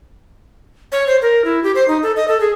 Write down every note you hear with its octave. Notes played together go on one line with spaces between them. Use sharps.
C#5
C5
A#4
E4
G4
C5
D#4
A4
D#5
A4
G#4